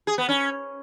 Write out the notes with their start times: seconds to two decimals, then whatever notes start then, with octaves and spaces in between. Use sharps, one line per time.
0.07 G#4
0.18 B3
0.29 C#4